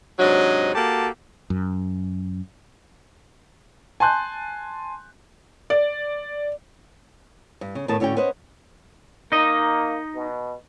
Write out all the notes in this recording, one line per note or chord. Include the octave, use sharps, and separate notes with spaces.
G#2 C3 F#3 D4 D#5
A#3 F#4 G4 A4 A5
F#2
G#5 A5 C6 F#6 G6
D5
G2
C#3
E2 A2 D#3 G#4 A5
A2 D3 C#4 F#4 G5
C#4 B4 C5 D#5 F#5
A#3 D#4 D#5
B2